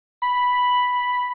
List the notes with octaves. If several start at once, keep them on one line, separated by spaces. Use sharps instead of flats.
B5